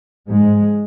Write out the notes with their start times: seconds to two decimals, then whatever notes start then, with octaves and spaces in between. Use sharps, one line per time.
0.29 G#2 G#3